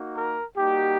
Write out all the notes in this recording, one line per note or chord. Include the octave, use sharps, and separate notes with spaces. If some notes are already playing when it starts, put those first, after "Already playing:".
Already playing: A#3 D#4 F#4
A#4
G3 A#3 D#4 F#4 G4